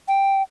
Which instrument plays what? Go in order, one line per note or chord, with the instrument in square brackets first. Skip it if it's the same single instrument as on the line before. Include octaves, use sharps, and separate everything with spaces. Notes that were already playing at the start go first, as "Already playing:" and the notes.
[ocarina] G5